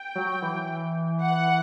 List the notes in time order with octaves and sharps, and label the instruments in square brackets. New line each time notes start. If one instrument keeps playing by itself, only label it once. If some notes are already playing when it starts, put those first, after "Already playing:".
Already playing: [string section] G5
[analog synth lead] F#3
E3
[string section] F#5